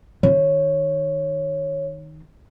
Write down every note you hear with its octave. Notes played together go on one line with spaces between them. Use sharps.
D#3 C#5